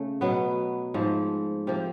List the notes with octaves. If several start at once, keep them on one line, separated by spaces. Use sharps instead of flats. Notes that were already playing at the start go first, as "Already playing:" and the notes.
Already playing: C#3 A3
B2 F#3 B3
G#2 F3 A3
C3 F3 A#3